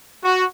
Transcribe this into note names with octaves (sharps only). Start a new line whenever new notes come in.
F#4